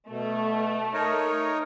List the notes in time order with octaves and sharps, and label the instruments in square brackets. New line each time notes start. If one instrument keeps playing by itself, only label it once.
[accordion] B2 [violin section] A3
[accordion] D#4 A#4 C#5